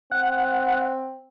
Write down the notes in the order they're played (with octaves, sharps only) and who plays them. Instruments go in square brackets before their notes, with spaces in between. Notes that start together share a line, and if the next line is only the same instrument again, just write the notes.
[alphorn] C4 [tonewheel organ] F#5